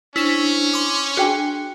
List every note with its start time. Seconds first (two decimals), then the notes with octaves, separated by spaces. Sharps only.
0.16 C#4 D4 E4 C5 C#6 E7
0.73 C6 D6
1.17 D4 F#4 G#4 G5 G#5